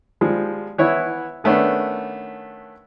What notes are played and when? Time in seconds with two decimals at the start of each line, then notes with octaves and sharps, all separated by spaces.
0.21 F3 G3 G#3
0.78 E3 B3 E4 C#5
1.44 D#3 A3 B3 C#4 D4